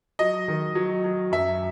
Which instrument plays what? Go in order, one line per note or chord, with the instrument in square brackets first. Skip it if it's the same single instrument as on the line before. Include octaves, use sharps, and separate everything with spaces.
[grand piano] F#3 D#5
D#3
F#3
F#3
F#2 E5